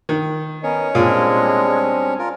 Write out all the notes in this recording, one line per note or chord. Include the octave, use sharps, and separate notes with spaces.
D#3
B3 C#4 A#4 C#5 D#5
A#2 G3 G#3 C4 D4
F4 A#4